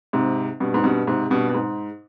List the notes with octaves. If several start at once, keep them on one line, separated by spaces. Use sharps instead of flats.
G#2 C3
G2 B2
G#2
G2 B2
G#2 C3
G2 B2
B2
G#2